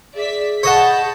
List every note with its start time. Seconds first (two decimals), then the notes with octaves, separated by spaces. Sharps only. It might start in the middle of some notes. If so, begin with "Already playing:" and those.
0.16 G#4 D5 E5 B6
0.63 C#5 D#5 F#5 A5 B5 G6